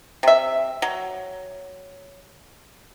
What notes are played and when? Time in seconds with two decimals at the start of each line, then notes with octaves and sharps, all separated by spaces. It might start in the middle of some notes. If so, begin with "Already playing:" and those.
0.23 C3 E5
0.82 F#3